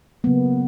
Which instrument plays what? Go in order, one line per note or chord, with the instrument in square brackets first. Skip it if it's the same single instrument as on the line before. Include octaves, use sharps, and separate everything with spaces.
[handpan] C#3 F#3 A#3 B3